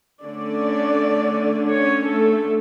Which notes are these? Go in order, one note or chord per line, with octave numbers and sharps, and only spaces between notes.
D3 A3 C#4 D4 D5
C#4 C#5
A3 A4